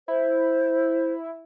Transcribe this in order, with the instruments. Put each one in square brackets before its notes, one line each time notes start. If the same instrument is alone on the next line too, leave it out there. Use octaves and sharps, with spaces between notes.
[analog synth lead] E4 [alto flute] C5